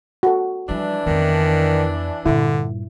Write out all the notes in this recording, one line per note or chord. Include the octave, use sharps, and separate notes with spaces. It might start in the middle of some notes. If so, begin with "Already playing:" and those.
F#4 A4
E3 F3 G3 D4
F2 D#3 B3
G2 A#2 D3 E4